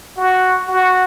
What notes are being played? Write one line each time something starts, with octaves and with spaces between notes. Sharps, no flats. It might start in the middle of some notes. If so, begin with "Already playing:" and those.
F#4
F#4